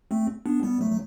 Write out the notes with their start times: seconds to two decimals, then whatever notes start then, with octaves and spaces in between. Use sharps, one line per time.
0.11 A3 C4
0.46 B3 D4
0.63 G3 B3
0.81 F#3 A3
0.91 F#3